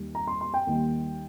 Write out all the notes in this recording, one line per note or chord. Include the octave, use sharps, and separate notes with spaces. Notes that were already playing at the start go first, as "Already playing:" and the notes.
Already playing: D#2 D#3 G3
A#5
C6
C6
G5
D#2 D#3 G3